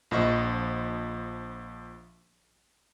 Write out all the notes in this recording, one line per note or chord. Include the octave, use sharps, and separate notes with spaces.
A#1 F3 D#5 C#6